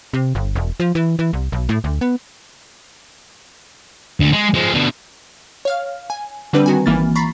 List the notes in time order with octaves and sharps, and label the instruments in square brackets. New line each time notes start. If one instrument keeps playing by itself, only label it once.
[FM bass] C3
G1
E1
F3
E3
E3
C2
B1
A2
D2
B3
[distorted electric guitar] D2
G#3
F3 G#3
B2 D3
[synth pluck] C#5 F5 F6
G#5
D3 G3 C4 D4 B4
D#3 F#4 G#5
G#1 E3 A#3 F6 A6
A#5 B5 C#6 A6 B6 C7